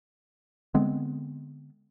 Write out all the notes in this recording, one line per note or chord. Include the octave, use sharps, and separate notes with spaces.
D3 G#3 B3 C4